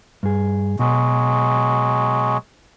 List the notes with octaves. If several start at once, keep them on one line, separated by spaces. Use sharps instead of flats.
G2 G#4
B2 F#3 G#3